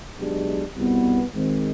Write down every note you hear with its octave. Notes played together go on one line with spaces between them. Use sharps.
B1 B2 G#3 D4 G4
C2 B2 B3
G#1 G#2 D#3 G#3 C4